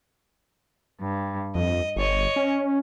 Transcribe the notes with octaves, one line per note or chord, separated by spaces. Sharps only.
G2
F2 D#5
G1 C#5 D#5
C#4